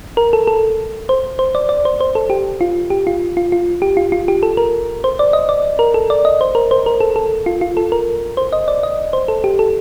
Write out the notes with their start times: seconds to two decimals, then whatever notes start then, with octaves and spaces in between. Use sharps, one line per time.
0.17 A#4
0.33 A4
0.47 A4
1.09 C5
1.39 C5
1.55 D5
1.69 D5
1.85 C5
2.01 C5
2.15 A4
2.30 G4
2.61 F4
2.90 G4
3.07 F4
3.37 F4
3.52 F4
3.82 G4
3.97 F4
4.12 F4
4.28 G4
4.43 A4
4.57 A#4
5.04 C5
5.19 D5
5.33 D#5
5.49 D5
5.79 A#4
5.94 A4
6.10 D5
6.25 D#5
6.41 C5
6.55 A#4
6.71 C5
6.86 A#4
7.00 A4
7.16 A4
7.46 F4
7.61 F4
7.77 A4
7.92 A#4
8.37 C5
8.53 D#5
8.68 D5
8.83 D#5
9.13 C5
9.28 A4
9.44 G4
9.59 A4